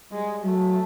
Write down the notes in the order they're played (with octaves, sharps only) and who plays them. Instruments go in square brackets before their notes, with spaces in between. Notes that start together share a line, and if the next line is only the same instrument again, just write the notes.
[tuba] G3 [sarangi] G#3
[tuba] F#3 [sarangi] A3